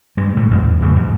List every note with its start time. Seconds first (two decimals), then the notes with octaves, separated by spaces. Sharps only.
0.17 G2 G#3
0.37 A2
0.51 A1 F#2
0.64 E2
0.81 E2 A2 C#3 F#3
0.96 G#2